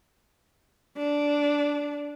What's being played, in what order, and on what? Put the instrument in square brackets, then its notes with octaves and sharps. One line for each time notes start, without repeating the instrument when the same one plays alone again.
[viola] D4